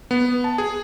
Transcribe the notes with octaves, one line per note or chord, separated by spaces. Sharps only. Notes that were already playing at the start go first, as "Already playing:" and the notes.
B3
A5
G#4